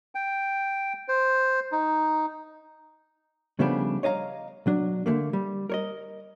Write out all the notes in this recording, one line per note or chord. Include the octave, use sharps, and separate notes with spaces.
G5
C5
D#4
C#3 F3 G3 A3 B3 D4
C#5 D#5 F5 A#5
B1 F#3 D4
D3 D#3 A3 A#3
G3
A#4 C#5 D#5